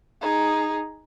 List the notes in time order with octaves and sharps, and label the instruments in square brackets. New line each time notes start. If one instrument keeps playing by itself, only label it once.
[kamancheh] D#4 G#4